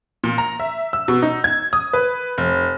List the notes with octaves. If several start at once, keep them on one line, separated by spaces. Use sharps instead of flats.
A#2
A#5
E5
E6
B2
D#4
G#6
D#6
B4
F1